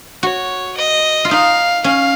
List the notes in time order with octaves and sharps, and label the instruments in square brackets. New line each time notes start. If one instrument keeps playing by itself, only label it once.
[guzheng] F#4 [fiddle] C#5
[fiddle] D#5
[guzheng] F4
[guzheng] D#4 [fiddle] F5
[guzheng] C#4 [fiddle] F5